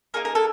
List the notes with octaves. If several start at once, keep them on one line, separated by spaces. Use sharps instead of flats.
A#3 D#4 G#4 A#4
A#4
A4